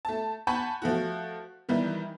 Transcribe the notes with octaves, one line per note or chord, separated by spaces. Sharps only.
A3 A5
F#5 G#5 A5 B5 C#6 G6
F3 A3 F#4
D#3 E3 G3 D#4